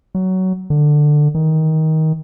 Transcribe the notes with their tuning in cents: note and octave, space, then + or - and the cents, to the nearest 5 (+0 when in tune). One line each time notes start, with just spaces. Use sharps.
F#3 +15
D3 +15
D#3 +20